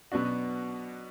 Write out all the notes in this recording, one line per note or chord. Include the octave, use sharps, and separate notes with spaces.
B2 F#3 B3 D4 F#4